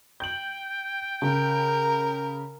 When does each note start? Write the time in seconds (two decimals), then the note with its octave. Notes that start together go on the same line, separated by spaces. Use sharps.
0.20 G5 G6 F#7
1.22 C#3 A#4